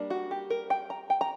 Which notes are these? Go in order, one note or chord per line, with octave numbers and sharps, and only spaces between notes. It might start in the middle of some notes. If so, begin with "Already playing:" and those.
Already playing: G3 A#3 D4
F#4
G4
A#4
G5
A#5
G5
A#5